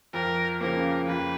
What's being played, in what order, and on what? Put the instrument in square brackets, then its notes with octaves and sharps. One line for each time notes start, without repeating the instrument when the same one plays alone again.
[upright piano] F2 [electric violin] A#4
[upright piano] C#3 F3 A#3 [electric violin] A#4
[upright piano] F2 [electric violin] B4